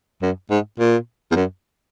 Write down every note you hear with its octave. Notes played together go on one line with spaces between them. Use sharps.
F#2
G#2
A#2
E2
F#2